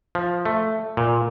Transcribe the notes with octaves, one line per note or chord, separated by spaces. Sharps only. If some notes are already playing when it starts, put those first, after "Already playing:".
F3
A3
A#2